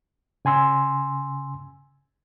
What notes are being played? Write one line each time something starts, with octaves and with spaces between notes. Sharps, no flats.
C#3 G#5 C6 E6